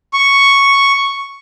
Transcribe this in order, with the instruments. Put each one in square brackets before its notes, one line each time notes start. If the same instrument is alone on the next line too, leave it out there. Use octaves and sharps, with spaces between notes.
[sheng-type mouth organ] C#6